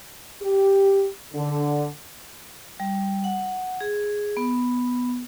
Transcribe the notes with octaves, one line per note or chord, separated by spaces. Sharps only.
G4
D3
G3
F#5
G#4
B3